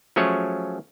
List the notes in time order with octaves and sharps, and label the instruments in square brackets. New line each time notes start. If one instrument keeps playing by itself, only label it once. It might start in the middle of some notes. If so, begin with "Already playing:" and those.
[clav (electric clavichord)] F3 F#3 A3 C#4 G#4 C#5